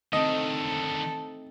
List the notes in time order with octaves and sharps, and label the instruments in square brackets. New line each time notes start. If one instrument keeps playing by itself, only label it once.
[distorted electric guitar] D3 D#3 [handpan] A3 C4 D#4 [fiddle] A4 [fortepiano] D#5